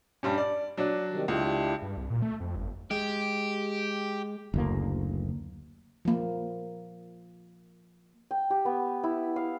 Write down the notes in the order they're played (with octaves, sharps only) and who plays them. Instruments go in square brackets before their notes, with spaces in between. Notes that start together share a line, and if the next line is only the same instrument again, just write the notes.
[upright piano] G2 G3 C#4
D5
F#3 D4
[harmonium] C3 D#3 G3
[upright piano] C#2 [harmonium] D4 E4 G4
[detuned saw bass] G2
C2
A#2
A3
F2
G1
[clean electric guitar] G#3 [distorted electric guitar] G4
[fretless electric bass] F#1 D2 A#3
[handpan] F3 A#3
[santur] G5
G4
B3
E4
F5